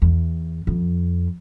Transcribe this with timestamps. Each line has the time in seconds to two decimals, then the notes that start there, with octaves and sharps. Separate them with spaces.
0.02 E2
0.67 F2